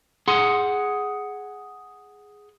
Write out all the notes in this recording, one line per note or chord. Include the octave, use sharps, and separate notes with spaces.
G#4 F#5 C6